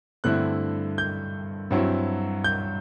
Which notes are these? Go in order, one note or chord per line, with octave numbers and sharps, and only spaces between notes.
G2 D3 A3 C4 E4 F#6
G6
G2 F#3 C4 E4
G6